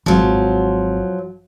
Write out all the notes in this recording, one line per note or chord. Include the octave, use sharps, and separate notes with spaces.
G#1 F3 F#3